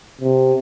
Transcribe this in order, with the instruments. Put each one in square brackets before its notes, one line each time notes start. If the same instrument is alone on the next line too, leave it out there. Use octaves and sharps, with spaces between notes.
[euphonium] C3